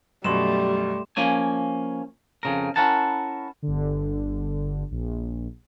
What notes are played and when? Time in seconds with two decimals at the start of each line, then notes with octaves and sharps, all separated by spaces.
0.24 F#2 B2 G3 A3 C6 E7
1.17 F3 A#3 C#4 G#5
2.43 F2 C#3 A#4
2.76 C#4 E4 A#4 F#5 A5
3.62 G1 D3
4.91 A#1